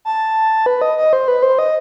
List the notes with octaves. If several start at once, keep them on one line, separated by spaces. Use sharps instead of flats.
A5
B4
D#5
D#5
C5
B4
C5
D#5